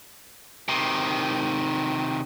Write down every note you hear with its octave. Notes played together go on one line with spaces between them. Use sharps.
C3 D#3